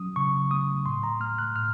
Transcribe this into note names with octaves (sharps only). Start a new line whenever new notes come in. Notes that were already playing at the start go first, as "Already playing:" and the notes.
Already playing: F#3 C#4 D#6
C#3 C#6
A3 D#6
A2 C6
A#5
A3 F6
F#6
A2 F6